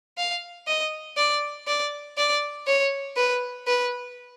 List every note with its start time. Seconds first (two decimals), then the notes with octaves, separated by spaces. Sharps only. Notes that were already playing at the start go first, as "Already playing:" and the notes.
0.18 F5
0.67 D#5
1.17 D5
1.67 D5
2.17 D5
2.67 C#5
3.17 B4
3.67 B4